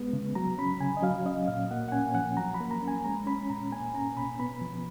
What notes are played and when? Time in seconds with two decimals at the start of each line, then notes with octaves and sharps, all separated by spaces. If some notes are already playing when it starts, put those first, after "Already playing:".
Already playing: G#3 B3
0.13 C#3
0.35 F#3 A#5
0.58 C#4 B5
0.81 C#3 G#5
0.97 D#5
1.02 F#3 F5
1.26 C#4 D#5
1.48 A#2 F5
1.71 A#3 F#5
1.89 F#5
1.92 C#4 G#5
2.15 F3 F#5
2.37 F#3 A#5
2.55 B5
2.60 A#3
2.71 A#5
2.82 C#4
2.88 G#5
3.04 G#3 A#5
3.27 C#4 B5
3.50 A#2 A#5
3.72 A#3 G#5
3.94 C#4 A#5
4.16 B2 B5
4.40 B3 B5
4.61 F3